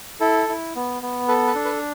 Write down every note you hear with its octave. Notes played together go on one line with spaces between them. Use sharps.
E4 A4
E4
B3
B3
A4 B4
B4
D4
B4